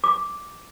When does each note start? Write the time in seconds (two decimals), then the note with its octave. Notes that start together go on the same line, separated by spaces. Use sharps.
0.04 D6